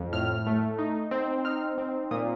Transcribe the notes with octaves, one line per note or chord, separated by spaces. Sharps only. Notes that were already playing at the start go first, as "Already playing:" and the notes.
Already playing: F2
A2 F6
A3
D#4
C4
D#4 F6
C4
A#2 D#6